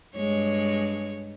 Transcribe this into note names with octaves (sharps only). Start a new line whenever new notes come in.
G2 G#3 C#5